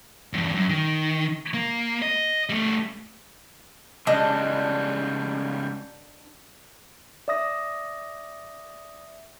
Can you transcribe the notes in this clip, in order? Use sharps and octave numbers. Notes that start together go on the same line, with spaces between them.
E2 G2
F#2
D#3
A#3
D#5
G3 A3
C#3 G3 G#3 D4 D#5
D5 E5 D#6 A#6